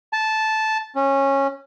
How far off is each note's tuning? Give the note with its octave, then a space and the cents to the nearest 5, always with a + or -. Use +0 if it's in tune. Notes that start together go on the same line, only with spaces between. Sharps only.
A5 -10
C#4 -15